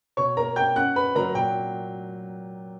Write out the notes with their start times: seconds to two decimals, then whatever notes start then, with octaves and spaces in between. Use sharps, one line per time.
0.17 B2 C#5 C#6
0.37 A#3 A#4 A#5
0.56 A#3 G5 G6
0.76 C#4 F#5 F#6
0.96 C#4 B4 B5
1.15 F#3 A#4 A#5
1.34 A#2 G5